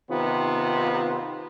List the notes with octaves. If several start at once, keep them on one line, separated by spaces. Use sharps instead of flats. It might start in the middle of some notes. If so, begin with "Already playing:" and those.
C3 D#3 B3 F4